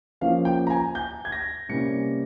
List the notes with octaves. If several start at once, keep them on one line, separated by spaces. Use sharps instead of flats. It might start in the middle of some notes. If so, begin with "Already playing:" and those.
F3 A#3 C#4 F5
G5
A#5
G#5
G6
G#6
A#6
C3 G3 A#3 C#4 C#7